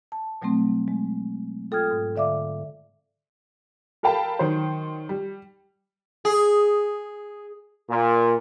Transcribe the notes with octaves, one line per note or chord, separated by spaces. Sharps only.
A5
B2 F#3 G3 A3 C4
G#3
F4 A4 G5 D#6 F6 G#6
G#2
D3 D5 E5 F5 D6
A4 A#4 F5 G5 A5 B5
D#3 F#3 C5
G3
G#4
A#2